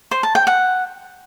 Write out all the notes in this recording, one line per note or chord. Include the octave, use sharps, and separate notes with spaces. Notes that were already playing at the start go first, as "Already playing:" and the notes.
C5
A5
G5
F#5